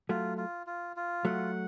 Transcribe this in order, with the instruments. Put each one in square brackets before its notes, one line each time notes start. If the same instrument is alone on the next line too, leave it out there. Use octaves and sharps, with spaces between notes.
[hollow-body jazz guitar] F#3 A3 [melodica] F4
[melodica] F4
F4
F4
[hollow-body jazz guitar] F#3 A3 [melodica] F#5